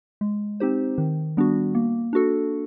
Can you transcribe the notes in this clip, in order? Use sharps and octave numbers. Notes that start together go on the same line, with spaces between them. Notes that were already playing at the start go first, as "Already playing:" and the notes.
G#3
C4 D#4 G4 C5
D#3
G3 B3 D4 F#4
A#3
D4 F#4 A4